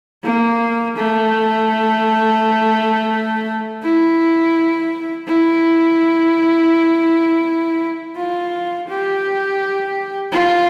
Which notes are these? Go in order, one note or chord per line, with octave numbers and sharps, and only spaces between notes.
A#3
A3
E4
E4
F4
G4
F4